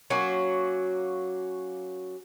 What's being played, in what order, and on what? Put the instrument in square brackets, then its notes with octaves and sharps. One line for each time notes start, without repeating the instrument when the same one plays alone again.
[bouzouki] F#3 A#3 C#4 F#4